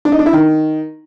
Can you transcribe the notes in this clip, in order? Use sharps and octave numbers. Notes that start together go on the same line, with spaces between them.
D4
D#4
D4
E4
D#3